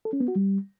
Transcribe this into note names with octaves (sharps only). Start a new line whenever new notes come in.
A4
C#4
B3
F#4
G3